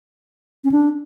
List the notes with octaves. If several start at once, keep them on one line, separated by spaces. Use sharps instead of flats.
C#4
D4